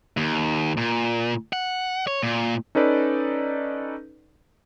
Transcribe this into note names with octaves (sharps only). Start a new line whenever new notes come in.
D#2
A#2
F#5
C#5
A#2
C#4 D#4 A4 B4 D5